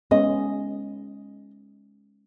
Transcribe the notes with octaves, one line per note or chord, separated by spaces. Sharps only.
G#3 B3 C#4 D#5